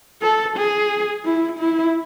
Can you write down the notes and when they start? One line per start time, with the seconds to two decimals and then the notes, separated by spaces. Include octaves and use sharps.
0.22 A4
0.57 G#4
1.25 E4
1.59 E4